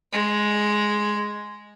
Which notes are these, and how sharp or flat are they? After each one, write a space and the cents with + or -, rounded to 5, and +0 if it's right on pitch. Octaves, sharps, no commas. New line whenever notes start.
G#3 +5